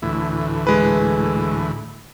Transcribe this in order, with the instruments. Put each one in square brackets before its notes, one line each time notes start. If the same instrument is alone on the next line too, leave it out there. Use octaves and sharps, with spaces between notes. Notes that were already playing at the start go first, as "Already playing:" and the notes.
[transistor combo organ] D2 A2 E3
[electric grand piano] G#3 B4